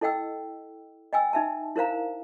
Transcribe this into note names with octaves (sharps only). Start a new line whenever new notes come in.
E4 A4 D#5 F#5 G5 E6
D#5 G5 G#5 E6
D#4 E5 A5
E4 A#4 C5 F5 A#5